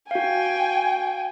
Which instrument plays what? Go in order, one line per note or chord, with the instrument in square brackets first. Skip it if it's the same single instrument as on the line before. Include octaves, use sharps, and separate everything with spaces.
[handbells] F#4 F5 [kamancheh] G5 G#5